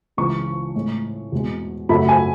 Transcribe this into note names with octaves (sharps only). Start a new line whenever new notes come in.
C#2 C#3 E3 G#3 C#6
A2 G#3
E2 B2 G#3
F#2 C#3 F#3 A3 B5
G#5